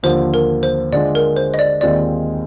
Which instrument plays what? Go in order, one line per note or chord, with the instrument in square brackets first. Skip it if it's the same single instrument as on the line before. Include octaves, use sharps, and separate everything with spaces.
[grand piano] D#2 D3 F3 A#3 F4 [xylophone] C5
[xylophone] A#4
C5
[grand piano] D3 G#3 D4 F4 [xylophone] D5
[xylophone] A#4
C5
D#5
D5
[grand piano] D#2 D#3 G#3 C4 F4 [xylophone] D5